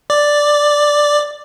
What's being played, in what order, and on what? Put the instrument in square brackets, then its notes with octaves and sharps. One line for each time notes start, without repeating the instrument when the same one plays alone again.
[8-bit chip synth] D5